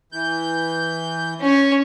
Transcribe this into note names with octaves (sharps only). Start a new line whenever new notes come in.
E3 G6
C#4 C#5